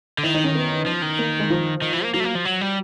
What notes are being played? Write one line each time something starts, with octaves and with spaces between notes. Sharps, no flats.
D3
D#3 E4
D#4
C#4
B3
F3
D#3
A#3
G#3
F3
D#3
E3
A#3
F#3 A#3
A3
A#3
F3
F#3
G3